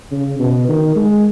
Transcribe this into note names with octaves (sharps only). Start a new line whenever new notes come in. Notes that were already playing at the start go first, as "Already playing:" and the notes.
C#3
B2
D#3
G#3